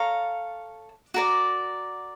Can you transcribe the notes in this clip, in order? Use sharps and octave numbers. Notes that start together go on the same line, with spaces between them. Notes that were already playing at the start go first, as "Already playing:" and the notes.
Already playing: A4 C#5 F5 A#5
F#4 A#4 D5